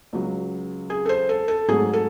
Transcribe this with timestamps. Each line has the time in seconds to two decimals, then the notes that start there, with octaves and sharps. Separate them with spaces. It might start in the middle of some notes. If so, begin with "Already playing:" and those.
0.13 C#2 C#3 F#3
0.90 G#4
1.06 A4
1.09 C5
1.29 A4
1.48 A4
1.68 G#2 F#3 A3 G#4
1.93 A4